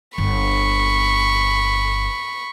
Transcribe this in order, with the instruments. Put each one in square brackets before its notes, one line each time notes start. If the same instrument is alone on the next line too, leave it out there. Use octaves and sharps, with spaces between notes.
[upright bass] G1 [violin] B5 C#6